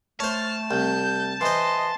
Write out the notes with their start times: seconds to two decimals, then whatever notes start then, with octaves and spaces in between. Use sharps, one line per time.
0.20 A3 C5 C#5 A5 F6
0.71 C2 G6
1.41 E3 C5 D#5 C6